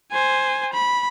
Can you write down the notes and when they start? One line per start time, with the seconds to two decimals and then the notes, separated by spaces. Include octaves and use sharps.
0.12 C5 G#5
0.73 B5